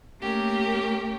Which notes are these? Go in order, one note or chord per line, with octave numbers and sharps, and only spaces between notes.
A3 A#3 C#4 G4 A#4